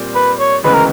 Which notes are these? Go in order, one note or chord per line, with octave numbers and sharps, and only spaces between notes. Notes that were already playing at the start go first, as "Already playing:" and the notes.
Already playing: A#2 G3 C4
B4
C#5
D2 C#3 E3 G#3 B3 B4
A#4